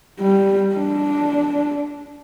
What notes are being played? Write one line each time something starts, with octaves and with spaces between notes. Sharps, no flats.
G3
D4